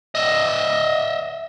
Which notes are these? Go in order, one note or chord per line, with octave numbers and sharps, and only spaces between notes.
D#5 E5